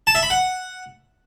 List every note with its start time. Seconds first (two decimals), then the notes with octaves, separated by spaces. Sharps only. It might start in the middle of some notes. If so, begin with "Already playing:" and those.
0.07 A5
0.15 E5
0.23 B5
0.30 F#5